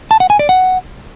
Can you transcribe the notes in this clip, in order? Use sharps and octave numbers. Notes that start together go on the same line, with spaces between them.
A5
F#5
G#5
D5
F#5